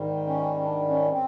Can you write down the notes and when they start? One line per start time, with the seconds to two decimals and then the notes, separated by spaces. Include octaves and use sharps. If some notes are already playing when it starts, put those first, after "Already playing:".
Already playing: G#2 D#3 G3
0.27 C#4
0.64 D4
0.88 C#4
1.12 C4